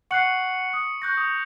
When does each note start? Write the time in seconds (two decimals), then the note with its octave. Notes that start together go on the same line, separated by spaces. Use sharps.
0.11 F#5 C#6 F#6 C7 C#7 F#7
0.73 D#6
1.02 C#6 F#6 G6 A#6
1.17 D#6